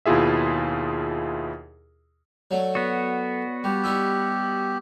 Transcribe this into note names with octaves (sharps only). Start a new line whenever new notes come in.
D#2 B2 E4 F4 G#4 E5
F#3 A3 C#5 D5 F#5
B3 F#4
G3 G4
G3 D#4 E4 E6